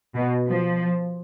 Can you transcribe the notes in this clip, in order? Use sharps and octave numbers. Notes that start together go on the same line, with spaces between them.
B2
F3